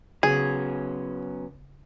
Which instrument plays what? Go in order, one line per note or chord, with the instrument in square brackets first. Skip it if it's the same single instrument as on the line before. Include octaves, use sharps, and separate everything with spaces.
[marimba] C#3 [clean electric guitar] F#3 B3 C#4 [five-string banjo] G#4